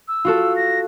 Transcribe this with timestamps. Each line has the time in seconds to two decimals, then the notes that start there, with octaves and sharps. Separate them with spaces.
0.07 E6
0.25 F4 F#4 A4
0.55 A#6